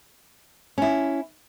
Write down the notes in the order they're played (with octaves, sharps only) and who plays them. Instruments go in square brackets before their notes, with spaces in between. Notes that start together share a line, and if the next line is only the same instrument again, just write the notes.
[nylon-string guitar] C#4 E4